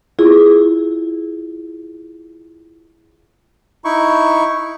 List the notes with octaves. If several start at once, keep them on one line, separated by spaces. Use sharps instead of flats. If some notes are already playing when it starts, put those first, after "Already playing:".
E4 F4 G#4
D#4 E4 C#6